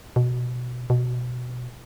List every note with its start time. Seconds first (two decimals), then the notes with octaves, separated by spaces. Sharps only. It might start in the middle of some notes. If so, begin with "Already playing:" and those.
0.16 B2
0.90 B2